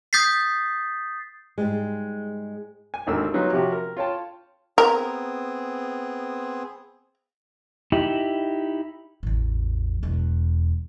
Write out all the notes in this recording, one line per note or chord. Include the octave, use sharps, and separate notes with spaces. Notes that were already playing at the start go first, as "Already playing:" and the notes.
D#6 G6 A6 B6 C7
G#2 G3 G#3
G#5
G#1 D#2 D3 E6
F#3 B3 C#4 D#4 F4 G4
C3 F3 C#4 F#4 G4
A#4
F4 C#5 G5 A5
B3 C4 G#4 A#4
D#4 E4 G4
A1 E2
E1 E2